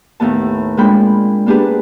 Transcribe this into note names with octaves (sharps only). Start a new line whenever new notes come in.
D#2 A2 B3 A5
A#2 G#3 C4 D4 G5 B5
A#3 B3 D4 G4 G#4 B4